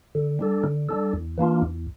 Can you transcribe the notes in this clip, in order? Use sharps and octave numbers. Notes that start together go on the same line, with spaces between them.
D3
G3 D4 A4
D3
G3 D4 A4
E2
E3 A#3 D4 F4
E2